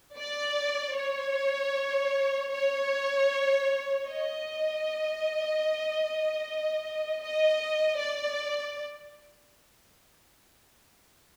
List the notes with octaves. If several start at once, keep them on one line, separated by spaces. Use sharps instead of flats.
D5
C#5
C#5
D#5
D#5
D5